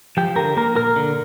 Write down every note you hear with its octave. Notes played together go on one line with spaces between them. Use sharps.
F3 G4
D3 A#4
A#3 A#4
A#2 A#4
D3